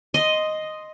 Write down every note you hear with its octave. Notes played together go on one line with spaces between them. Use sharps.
D#5 C6